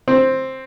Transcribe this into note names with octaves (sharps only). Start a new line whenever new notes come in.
C4